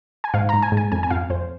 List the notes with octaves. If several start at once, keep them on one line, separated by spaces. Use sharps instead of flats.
G#5
G#2 F5
G#2 A#5
G#5
G#2
G#5
F2 G#5
G#5
F2 F5
F2 C5